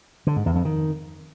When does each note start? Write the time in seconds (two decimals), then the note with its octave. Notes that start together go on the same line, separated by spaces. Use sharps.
0.27 D3
0.36 G#2
0.46 E2
0.55 F2
0.65 D#3